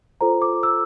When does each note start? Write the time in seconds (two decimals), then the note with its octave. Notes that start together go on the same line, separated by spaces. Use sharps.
0.21 F4 A4 C5 A#5
0.42 D6
0.63 E6